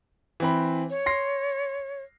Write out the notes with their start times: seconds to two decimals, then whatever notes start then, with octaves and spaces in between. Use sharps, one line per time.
0.40 E3 C4 B5
0.90 C#5
1.06 C6 A#6 C7